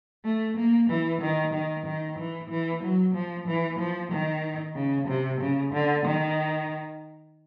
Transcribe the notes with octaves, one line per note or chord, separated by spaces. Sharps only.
A3
A#3
E3
D#3
D#3
D#3
E3
E3
F#3
F3
E3
F3
D#3
C#3
C3
C#3
D3
D#3